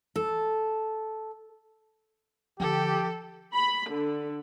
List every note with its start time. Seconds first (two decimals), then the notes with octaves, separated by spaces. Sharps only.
0.16 A4
2.60 D3 F3 G4 A4
3.54 B5
3.89 D3